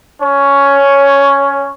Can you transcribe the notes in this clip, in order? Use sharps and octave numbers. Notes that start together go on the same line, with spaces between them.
C#4 C#5